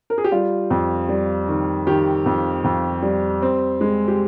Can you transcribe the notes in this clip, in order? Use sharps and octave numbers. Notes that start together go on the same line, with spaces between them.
A#4
G#4
G4
G3 F4
F2
G3
D#3
D#3 G4
F2
F2
G3
C4
G#3
G4